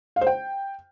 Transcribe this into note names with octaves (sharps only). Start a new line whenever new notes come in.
F5
C5
G5